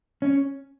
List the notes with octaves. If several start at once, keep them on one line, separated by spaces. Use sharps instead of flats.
C#4